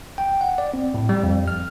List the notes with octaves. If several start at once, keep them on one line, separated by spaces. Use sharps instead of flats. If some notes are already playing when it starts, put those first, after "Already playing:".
G5
F#5
D5
C4
A2
G3
F2
F6